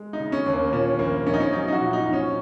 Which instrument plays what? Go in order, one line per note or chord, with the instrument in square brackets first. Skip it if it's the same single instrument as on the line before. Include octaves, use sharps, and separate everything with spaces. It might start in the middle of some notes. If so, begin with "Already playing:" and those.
Already playing: [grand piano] G#3
D#4
C#3
C#4
D#2
A#3
A#2 C#4
A#1 A#3
A#1 C#4
D#4
C#4
F#3 D#4
D#4
F#4
A#2
D#4
A#1
C#4